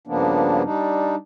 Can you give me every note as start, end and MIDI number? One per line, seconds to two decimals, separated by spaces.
0.07 0.62 43
0.07 0.62 49
0.07 0.62 53
0.07 0.62 58
0.07 0.62 59
0.07 0.62 62
0.64 1.15 55
0.64 1.15 62
0.64 1.15 63